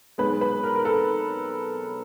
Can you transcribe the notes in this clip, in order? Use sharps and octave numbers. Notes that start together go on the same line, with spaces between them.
B1 B2 G#3 B4
B4
A#4
A#4
A4